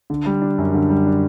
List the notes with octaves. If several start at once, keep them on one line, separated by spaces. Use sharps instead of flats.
D3
G3
D4
F#2
D3
G3
D4